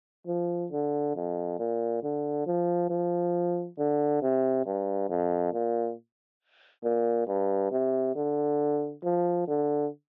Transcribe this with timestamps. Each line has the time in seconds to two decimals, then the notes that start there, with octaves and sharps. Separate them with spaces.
0.27 F3
0.72 D3
1.16 F2
1.59 A#2
2.03 D3
2.47 F3
2.90 F3
3.78 D3
4.22 C3
4.66 G2
5.09 F2
5.53 A#2
6.84 A#2
7.28 G2
7.72 C3
8.15 D3
9.04 F3
9.48 D3